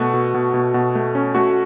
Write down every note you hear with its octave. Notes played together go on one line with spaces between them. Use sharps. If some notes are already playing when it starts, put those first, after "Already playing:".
Already playing: B2 A3 F#4
B2
B2
B2
B2
A3
C#4
A3 F#4